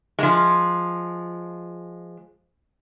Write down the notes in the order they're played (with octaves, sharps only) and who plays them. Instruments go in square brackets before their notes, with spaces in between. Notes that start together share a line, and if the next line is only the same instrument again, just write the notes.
[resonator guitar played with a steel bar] F3 G#3